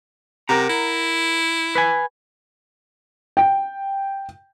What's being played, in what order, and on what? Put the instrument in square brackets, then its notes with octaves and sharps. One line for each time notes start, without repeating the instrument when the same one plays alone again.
[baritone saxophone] C3 [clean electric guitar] A#4 F#5 A#5
[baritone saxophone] E4
[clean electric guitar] B4 G#5
[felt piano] G5